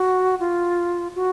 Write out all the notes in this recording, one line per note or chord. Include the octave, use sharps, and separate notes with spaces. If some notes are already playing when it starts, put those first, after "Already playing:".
Already playing: F#4
F4
F#4